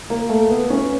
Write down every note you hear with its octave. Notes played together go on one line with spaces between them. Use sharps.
A#3
A3
B3
C#4